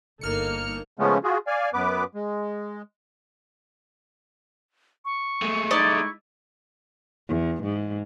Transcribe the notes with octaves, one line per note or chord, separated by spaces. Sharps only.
G1 A#3 D#4 A4 F6 C#7
C#3 F3 G#3 A3 B3 C#4
F4 F#4 G#4
D5 F5 G#5
F#2 B3 B4 D6
G#3
C#6
G#3 A3
D#4 E4 D5 D#5
E2
G#2